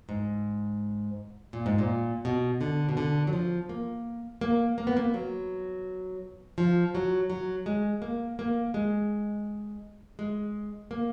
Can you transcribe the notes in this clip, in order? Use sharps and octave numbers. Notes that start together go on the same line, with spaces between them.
G#2
A#2
G#2
A#2
B2
D3
B2
D3
F#3
F3
A#3
A#3
A#3
B3
A#3
F#3
F3
F#3
F#3
G#3
A#3
A#3
G#3
G#3
A#3